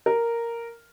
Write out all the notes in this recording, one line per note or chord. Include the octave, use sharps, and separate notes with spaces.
A#4